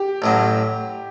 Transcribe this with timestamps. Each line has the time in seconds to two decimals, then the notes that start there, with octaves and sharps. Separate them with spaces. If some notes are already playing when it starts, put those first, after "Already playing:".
Already playing: G4
0.22 A1 A2 F#3